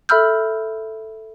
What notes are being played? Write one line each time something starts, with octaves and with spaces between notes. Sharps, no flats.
A4 E5 B5 E6 F6 G6